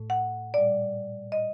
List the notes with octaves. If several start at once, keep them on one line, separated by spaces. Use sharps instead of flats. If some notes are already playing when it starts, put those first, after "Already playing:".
Already playing: A2 A3
F#5
A#2 G3 D5
D#5